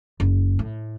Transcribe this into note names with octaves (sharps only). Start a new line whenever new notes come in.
F#1
A2